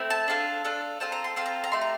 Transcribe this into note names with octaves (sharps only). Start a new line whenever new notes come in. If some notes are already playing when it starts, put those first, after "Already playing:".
Already playing: A3 C4 E4
A5
D4 F4 A4
D4 F4 A4
C4 F4 A4 A5
A#5
C6
C4 F4 A4 C6
A#5
A#5
A3 E4 G4 C6
A#5